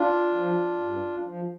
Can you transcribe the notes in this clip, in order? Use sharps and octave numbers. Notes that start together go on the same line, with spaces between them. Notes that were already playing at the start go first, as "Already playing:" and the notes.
Already playing: D4 F4
F3
G2
F3